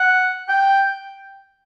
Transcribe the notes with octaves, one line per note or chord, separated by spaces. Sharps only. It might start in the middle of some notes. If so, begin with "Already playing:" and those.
Already playing: F#5
G5